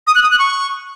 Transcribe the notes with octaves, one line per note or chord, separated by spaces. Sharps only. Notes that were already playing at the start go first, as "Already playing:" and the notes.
D#6
F#6
D#6
F#6
C#6